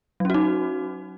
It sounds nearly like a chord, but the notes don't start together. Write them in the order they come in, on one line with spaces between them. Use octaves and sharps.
F#3 C#4 F#4 D#4